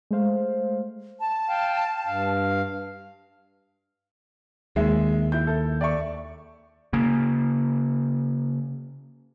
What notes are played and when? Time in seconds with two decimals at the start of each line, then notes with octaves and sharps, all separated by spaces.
0.11 G#3 A3 C5 F5
1.20 A5
1.49 F5 G5
2.07 G2 F5
4.76 D#2 G#3 E5
5.32 E4 G6
5.47 A4
5.81 D5 E5 C#6
6.93 C#3 A#3